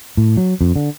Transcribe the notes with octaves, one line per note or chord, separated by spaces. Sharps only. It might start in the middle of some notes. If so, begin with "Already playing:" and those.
A2
F#3
F2
D3